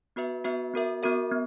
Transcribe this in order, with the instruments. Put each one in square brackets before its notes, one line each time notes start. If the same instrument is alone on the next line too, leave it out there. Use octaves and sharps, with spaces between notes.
[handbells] B3 F#4 B4 E5
B3 F#4 B4 E5
B3 F#4 A#4 E5
B3 F#4 A#4 E5
B3